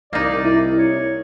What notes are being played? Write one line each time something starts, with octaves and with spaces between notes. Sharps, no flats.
C2 A#3 D#4 D5 D#5 A#5
E4
C#5